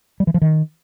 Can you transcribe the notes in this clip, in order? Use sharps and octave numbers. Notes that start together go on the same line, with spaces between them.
G3
E3
F3
D#3